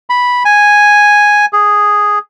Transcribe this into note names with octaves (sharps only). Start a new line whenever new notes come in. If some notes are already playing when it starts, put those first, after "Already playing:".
B5
G#5
G#4